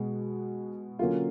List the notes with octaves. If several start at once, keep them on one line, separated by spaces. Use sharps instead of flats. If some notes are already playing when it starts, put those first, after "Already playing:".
Already playing: B2 G#3 B3
D3 F#3 A#3 C#4 F4